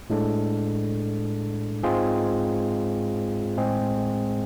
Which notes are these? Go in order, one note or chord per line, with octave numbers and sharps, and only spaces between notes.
A2 G#3 D4 A4
G#2 G#3 C4 F4 G#4
A2 G#3 C4 G#4